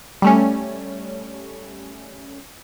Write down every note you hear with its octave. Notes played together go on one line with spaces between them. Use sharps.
G3 A3 C#4